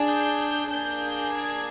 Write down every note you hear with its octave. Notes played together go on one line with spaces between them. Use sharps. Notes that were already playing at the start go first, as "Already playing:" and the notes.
Already playing: D4 G#4
G6
G6
A#3 D4 G#4 G6
G#6